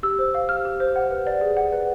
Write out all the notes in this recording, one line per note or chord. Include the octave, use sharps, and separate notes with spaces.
G4 E6
C5
F5
G4 F6
G4
C5
F#5
B4
D5
G#4
F#5
B4